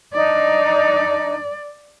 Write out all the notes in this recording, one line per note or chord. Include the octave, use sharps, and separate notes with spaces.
D4 D#4 D5